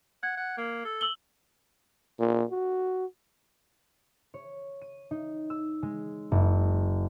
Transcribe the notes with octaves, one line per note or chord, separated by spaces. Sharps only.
F#5 G#6
F#5
A#3
A4
E6 F#7 G7
A#2
F#4
C#5
D#7
D#4
E6
G#3
F#1